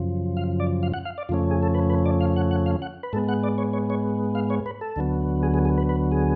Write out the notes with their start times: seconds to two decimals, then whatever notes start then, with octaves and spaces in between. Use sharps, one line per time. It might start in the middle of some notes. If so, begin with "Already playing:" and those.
Already playing: F#2 C#3 F3
0.37 F5
0.60 D5
0.83 F5
0.94 F#5
1.05 F5
1.18 D5
1.29 F2 C#3 F3 A3 C#4 F4
1.51 G#4
1.63 A4
1.74 B4
1.90 B4
2.06 D5
2.21 F5
2.36 F#5
2.51 F#5
2.66 F5
2.82 F#5
3.03 B4
3.13 G#2 G#3 B3 A4
3.29 F#5
3.44 D5
3.58 C#5
3.73 C#5
3.90 C#5
4.35 F5
4.50 C#5
4.66 B4
4.81 A4
4.96 D2 D3 F#3 B3
5.43 G#4
5.54 G#4
5.65 G#4
5.78 B4
5.89 B4
6.12 G#4